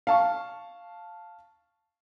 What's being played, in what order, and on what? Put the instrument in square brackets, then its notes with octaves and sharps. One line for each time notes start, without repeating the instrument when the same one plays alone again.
[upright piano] F5 A5 C#6